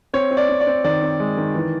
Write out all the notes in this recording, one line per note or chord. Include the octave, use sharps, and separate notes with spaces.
C4 C#5
C4
D5
C4
D5
C4
D#3 D5
C4
G#3
D#3
E3